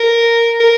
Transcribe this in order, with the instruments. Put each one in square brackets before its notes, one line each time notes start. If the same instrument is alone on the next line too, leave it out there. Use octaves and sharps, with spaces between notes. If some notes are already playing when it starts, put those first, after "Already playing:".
Already playing: [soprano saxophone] A#4
A#4